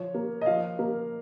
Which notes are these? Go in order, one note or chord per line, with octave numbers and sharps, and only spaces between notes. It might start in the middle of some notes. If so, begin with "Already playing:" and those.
Already playing: F3 C#5
A#3
D#5
F3 F5
A#3